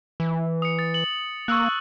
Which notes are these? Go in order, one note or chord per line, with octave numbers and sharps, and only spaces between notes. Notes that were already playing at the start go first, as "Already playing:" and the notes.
E3
D#6 C#7
D#6 A6
F#7
A#3 C#6 E6 F#6